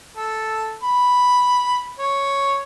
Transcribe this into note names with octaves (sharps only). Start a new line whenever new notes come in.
A4
B5
C#5